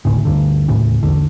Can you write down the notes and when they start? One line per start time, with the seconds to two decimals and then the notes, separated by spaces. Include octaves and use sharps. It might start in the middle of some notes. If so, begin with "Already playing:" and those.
0.05 G1 D2 A2 C#3
0.25 D2 G2 D3
0.68 D#1 A2 C#3
1.03 A#1 E2 D3